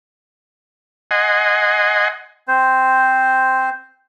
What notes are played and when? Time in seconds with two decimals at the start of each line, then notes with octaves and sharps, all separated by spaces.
1.11 D#5 F#5 G#5 C6
2.48 C4 C5